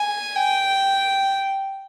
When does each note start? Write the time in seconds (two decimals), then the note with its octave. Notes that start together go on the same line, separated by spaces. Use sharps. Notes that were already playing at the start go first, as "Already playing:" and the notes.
Already playing: G#5
0.35 G5